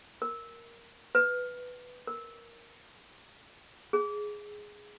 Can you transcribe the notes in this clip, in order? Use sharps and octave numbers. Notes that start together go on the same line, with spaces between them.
A#4
B4
A#4
G#4